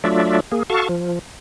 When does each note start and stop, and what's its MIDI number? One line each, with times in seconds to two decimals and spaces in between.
0.04 0.40 54
0.04 0.40 57
0.04 0.40 62
0.04 0.40 65
0.04 0.40 74
0.04 0.40 76
0.52 0.63 58
0.52 0.63 68
0.70 0.88 66
0.70 0.88 69
0.70 0.88 77
0.70 0.88 81
0.70 0.88 85
0.89 1.19 53